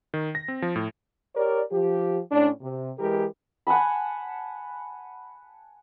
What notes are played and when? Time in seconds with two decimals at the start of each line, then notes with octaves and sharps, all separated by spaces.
0.14 D#3
0.35 A#6
0.48 C4
0.62 F3
0.76 A2
1.34 G4 A#4 C#5 D5
1.70 F3 G4
2.30 A2 C#4 D4
2.61 C3
2.98 E3 G#3 G4 A#4
3.67 F#5 G#5 A5 B5